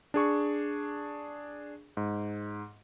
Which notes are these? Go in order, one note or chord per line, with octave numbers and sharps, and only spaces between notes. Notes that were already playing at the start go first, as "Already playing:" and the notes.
D4 G#4 C#6
G#2